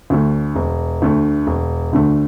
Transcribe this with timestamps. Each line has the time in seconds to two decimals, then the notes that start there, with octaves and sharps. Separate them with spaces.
0.10 D2 D3 A3
0.56 E1
1.02 D2 D3 A3
1.47 E1
1.93 D2 D3 A3